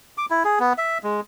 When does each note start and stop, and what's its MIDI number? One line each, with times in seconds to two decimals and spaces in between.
0.18 0.26 86
0.30 0.43 64
0.45 0.59 68
0.60 0.73 59
0.78 0.98 76
1.03 1.21 56